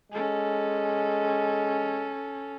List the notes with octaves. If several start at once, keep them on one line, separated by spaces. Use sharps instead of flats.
G#3 C#4 A4